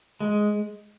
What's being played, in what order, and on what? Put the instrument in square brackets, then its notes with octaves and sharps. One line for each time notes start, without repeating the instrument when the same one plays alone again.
[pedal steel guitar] G#3